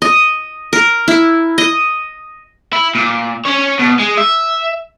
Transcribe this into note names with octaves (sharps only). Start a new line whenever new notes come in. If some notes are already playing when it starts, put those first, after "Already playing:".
D#5
A#4
E4
D#5
E4
A#2
C#4 C#5
B2
G#3
E5